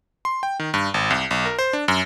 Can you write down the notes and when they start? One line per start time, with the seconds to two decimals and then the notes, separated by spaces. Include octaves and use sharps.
0.25 C6
0.43 G5
0.59 D#3
0.74 G2
0.94 G#1
1.10 C2
1.31 B1
1.45 A#4
1.59 C5
1.73 D4
1.88 F#2